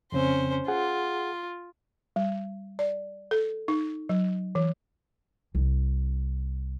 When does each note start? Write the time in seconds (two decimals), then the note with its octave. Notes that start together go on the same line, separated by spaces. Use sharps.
0.12 F2 C#3 C4 C#4 C5
0.68 F4 G#4 F#5
2.16 G3
2.79 D5
3.31 A4
3.68 D#4
4.09 F#3
4.55 E3
5.55 C2 E4